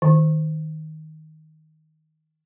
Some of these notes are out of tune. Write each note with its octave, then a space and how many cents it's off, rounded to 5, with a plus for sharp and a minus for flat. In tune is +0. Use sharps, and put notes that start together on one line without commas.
D#3 +10